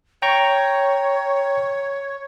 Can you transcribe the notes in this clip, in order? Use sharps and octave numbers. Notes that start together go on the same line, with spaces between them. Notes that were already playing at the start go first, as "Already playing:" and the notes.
C#5 G5 A#5 C#6